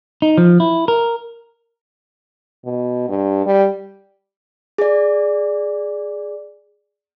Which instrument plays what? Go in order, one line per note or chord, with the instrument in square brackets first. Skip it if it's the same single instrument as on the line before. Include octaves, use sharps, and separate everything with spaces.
[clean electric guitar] D#4
F3
E4
A#4
[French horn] B2
G2
G3
[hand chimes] G#4 D5